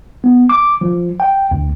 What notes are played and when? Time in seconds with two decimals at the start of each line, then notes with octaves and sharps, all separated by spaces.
0.24 B3
0.49 D6
0.81 F3
1.20 G5
1.51 D2